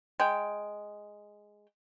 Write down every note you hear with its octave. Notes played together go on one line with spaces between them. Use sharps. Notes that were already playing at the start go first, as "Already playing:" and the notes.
G#3 G5